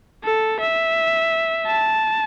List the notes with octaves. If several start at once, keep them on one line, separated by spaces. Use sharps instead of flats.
A4
E5
A5